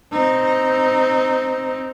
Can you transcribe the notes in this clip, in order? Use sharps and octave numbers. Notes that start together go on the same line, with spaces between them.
C4 D#4